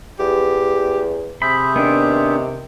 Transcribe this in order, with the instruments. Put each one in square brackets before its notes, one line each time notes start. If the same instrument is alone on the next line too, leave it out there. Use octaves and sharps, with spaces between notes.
[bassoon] E2 [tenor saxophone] G4
[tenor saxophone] C3 [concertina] G#4 C5 E5 [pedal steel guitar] B5
[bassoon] D#3 [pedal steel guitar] B3 D4